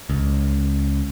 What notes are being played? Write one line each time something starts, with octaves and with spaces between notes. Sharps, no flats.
C#2